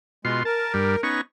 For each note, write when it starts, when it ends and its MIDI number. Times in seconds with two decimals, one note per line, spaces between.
0.25 0.43 47
0.25 0.41 56
0.25 0.43 65
0.25 0.43 84
0.45 1.01 70
0.45 0.73 81
0.74 0.96 43
0.74 0.96 55
1.03 1.21 59
1.03 1.21 61
1.03 1.21 63
1.03 1.21 85